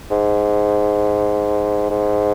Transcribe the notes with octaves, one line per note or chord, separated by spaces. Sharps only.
G#2
G#2